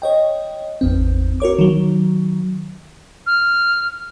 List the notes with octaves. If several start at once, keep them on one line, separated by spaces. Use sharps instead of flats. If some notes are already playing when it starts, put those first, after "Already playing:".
C#5 D#5 G5
G#1 E2 C4
F#4 A#4 C#5 D6
D#3 F#3
F6